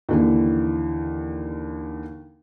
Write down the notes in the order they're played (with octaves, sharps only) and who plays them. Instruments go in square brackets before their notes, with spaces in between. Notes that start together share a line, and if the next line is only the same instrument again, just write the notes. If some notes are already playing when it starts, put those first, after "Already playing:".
[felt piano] D#2 D3 E3